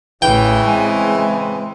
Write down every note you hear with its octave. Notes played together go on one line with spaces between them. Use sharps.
A1 C#3 E3 G5
G#3 C4 G#5